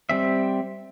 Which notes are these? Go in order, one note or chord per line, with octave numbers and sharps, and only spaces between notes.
G3 C4 E5